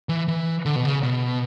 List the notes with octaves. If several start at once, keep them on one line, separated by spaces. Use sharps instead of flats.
E3
E3
D3
B2
C#3
B2